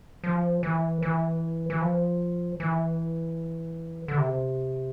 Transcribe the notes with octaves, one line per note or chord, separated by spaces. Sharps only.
F3
E3
E3
E3
F3
E3
D3
C3